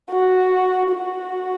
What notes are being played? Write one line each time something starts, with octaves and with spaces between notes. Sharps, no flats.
F#4
F#4